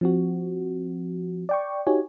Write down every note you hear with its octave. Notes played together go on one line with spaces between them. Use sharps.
F3 C4 F#4
D5 G5 C#6
D#4 F#4 G4 C#5 G#5